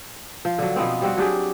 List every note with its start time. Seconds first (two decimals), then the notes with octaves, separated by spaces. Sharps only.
0.45 F3
0.58 D3 F#3
0.76 B2 F3 B3 C4
1.01 G3 C4 F#4
1.17 F#3 D4 G4 G#4